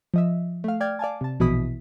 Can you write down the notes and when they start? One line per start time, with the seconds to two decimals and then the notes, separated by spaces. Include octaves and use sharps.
0.14 F3 D#5 E5
0.64 A3 F5
0.81 D5 G5 F6 G#6
0.99 D5 F5 G#5 A5
1.21 C3 A5
1.40 A#1 B2 E3 E4 D#6 B6